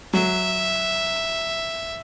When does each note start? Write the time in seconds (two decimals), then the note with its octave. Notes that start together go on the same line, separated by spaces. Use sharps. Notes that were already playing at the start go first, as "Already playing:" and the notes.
0.13 F#3 E5